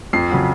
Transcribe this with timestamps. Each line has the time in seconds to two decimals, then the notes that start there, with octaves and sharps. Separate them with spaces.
0.13 F2 C7
0.30 C#3 F#3